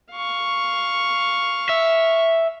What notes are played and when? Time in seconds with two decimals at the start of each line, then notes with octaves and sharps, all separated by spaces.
0.11 F5 C#6
1.69 E5